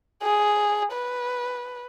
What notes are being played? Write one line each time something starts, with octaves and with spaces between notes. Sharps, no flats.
G#4
B4